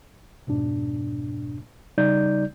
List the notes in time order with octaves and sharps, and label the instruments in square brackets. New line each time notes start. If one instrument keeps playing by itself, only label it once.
[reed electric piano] F2 G#2 B2 D4
C#3 G3 D#4 D5 G6